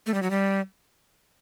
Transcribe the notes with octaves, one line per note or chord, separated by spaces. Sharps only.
A3
G3
F#3
G3